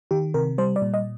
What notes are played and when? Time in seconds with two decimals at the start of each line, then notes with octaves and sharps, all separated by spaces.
0.11 D#3 G4
0.34 C3 A#4
0.58 G3 C5
0.76 D5
0.82 A#2
0.94 D#5